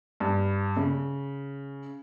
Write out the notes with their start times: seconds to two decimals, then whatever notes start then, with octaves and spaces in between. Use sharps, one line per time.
0.20 G2
0.77 C#3